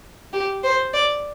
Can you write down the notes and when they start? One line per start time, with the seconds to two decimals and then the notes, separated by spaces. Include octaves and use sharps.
0.33 G4
0.63 C5
0.94 D5